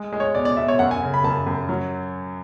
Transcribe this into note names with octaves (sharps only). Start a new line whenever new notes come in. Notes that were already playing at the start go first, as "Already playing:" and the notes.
Already playing: G#3
G#3
C#5
B2 D5
D5
B2 E5
C#5
F#2 F#5
G#5
C#3
B5
F#2 A5
F#2
F#3